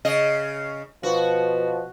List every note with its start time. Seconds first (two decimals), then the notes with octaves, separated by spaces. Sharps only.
0.05 C#3 D#5
1.03 B2 F3 F#4